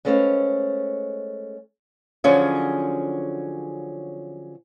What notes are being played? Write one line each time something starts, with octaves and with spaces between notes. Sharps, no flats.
G#3 A3 C#4 B4 C5 F5
D3 F3 F#3 C#4 G#4